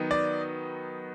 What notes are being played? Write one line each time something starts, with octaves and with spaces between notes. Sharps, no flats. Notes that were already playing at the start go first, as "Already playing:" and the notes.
Already playing: D#3 F#3 B3 D#4
D5